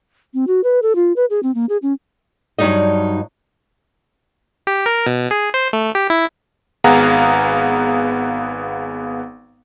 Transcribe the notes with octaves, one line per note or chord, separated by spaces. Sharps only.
C4
F#4
B4
A4
F4
B4
G#4
C4
A#3
G#4
C#4
G2 F#3 G3 D#4 D#5
G4
A#4
B2
G#4
C5
A3
G4
E4
G#1 B3 G#4 F5 F#5 A#5